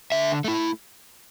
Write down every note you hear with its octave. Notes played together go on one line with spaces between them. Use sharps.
D3 E5
A3 E4